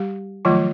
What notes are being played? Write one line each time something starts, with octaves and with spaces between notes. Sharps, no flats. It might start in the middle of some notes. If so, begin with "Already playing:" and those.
Already playing: G3 G4
D#3 F3 F#3 A3 F4